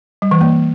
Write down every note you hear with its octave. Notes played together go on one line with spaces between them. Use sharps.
G3
E3
A#3